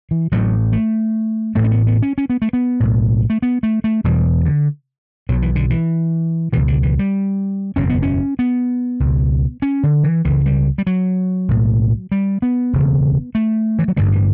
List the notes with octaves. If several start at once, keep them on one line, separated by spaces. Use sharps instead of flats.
E3
A1 A2 F#3
A3
A1 A2 A3
C#4
B3
B3
C#4
C#4
B3
A3
B3
B1 A2
A3
B3
A3
A3
E1 E2 B2 G3
D3
B1 B2 F#3
E3
D3
E3
C#2 B2 E3
D3
E3
G3
F#1 E2 B2 C#4
B3
C#4
B3
C#2 B2
C#4
D3
E3
C#2 C#3 E3
G3
G3
F#3
B1 A2
G3
B3
E1 D2 C#3
A3
E3
F#3
A1 G2 D3 G3
E3